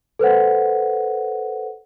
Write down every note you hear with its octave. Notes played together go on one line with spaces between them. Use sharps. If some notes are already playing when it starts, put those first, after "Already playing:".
A4 B4 C5 F#5